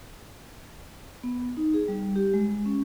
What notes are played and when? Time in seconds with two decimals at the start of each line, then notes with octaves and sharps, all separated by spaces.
1.23 B3
1.57 D#4
1.74 G#4
1.88 G3
2.16 G4
2.34 G#3
2.66 C#4